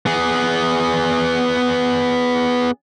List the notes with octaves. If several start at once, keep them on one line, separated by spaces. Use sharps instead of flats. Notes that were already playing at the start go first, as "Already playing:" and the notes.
B3 G#4